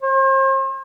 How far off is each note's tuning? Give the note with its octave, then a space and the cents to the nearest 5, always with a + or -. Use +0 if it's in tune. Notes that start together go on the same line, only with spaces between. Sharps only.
C5 +40